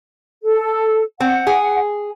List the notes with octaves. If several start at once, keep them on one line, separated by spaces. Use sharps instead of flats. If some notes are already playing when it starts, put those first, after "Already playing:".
A4
C4 F#5
G#4